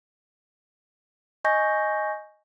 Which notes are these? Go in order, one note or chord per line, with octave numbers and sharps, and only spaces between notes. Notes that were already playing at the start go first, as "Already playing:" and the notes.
D#5 G#5 C#6 G6 A#6